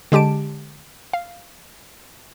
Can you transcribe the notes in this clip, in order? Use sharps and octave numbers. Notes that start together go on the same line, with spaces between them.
D3 G#3 G4 A5 D7
F5